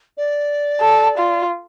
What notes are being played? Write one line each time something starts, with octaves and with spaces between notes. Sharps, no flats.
D5
A4
F4